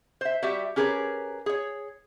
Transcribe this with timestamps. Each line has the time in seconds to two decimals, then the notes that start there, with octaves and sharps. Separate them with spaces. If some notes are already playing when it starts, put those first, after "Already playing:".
0.21 C5 E5
0.42 G3 F#4 G4 E5
0.76 C#4 G4 G#4 A#4 B4 C#5
1.46 G#4 C#5